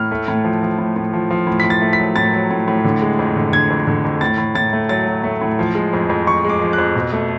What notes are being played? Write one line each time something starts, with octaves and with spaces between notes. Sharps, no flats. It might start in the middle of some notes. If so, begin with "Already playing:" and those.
Already playing: A2 F6
A3
A2
F3
F3
A2
A2
F3
F3
A2
A2 B6
A6
A3
B6
F#3
A2 A6
F#3
A2
A2
D3
G#3
F2
D3
D3 G#6
F2
D3
F2
A2 A6
A2
A2 A6
A3
F#3 A6
F#3
A3
A2
F3
G#3
F2
F2
F3 C#6
G#3 D6
F3
F#6
F2
B2
A3